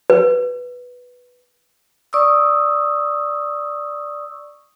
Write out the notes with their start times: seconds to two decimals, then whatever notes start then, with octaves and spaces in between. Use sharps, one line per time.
0.10 B4
2.13 D5 C#6 D#6 E6